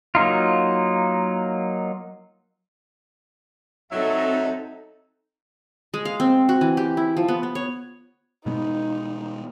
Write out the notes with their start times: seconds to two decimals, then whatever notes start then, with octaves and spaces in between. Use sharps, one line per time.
0.15 F#3 A#3 D#4 F4
3.91 F#3 C4 D#4 A4 E5
5.94 G#3
6.05 F5
6.20 C4
6.49 F#4
6.61 E3
6.77 G4
6.97 E4
7.17 F3
7.28 B3
7.43 B3
7.55 C#5
8.46 B2 G#3 B3 D#4